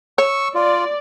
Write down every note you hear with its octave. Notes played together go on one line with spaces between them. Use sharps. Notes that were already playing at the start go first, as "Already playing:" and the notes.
C#5 C#6 E6
F4 D5